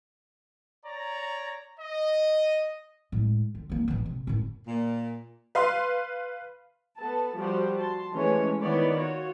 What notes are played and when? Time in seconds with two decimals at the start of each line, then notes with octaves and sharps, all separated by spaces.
0.86 C#5 D5 A#5
1.80 D#5
3.12 A2 G#3
3.55 D3
3.70 E3 A#3
3.88 A1 E3
4.06 C3
4.27 F#2 A2
4.68 A#2
5.55 B4 F5 C6
6.98 B3 A4 A5
7.35 F3 G3 F#4 G4 C5
7.77 A5 C6
8.13 E3 G#3 A3 C#4 C#5
8.60 D#3 B3 E4 C#5 D5
8.97 F4 F#4 C#5